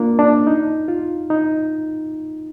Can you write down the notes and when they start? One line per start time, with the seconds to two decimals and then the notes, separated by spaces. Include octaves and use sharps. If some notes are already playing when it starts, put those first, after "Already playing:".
Already playing: A#3 D4 F4
0.19 D4
0.47 D#4
0.88 F4
1.30 D#4